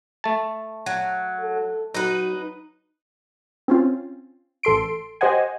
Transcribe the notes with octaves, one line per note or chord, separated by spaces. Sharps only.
A3 A5
F#3
A4
F#3 D#4 B4
C4 C#4 F4
A1 A4 C6 D7
G4 C5 D#5 F#5 G#5